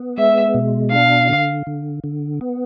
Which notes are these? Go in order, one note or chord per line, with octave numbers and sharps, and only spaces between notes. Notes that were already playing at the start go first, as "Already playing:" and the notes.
Already playing: B3
G#3 E5
B2
D4 F5
D3
D3
D3
B3